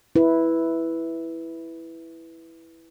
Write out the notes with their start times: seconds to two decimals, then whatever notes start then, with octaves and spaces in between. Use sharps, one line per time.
0.16 E4 B4